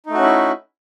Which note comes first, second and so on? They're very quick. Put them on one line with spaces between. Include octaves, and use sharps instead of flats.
D#4 A3 F#4 C#4 E4